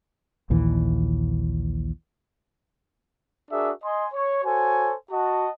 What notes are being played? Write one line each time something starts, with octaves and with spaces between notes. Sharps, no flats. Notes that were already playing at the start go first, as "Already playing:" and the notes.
A#1 D#2 A#2 E3
D4 F#4 G#4 A#4 E5
D#5 G#5 C6
C#5 C#6
F#4 A4 C5 C#5 G#5
F#4 D#5 F#5 A5